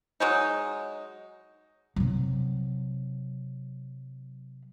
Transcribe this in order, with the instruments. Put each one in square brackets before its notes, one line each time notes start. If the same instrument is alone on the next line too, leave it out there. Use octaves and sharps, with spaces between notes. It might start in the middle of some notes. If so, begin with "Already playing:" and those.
[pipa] F#3 G#3 D#4
[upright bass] C3 F#3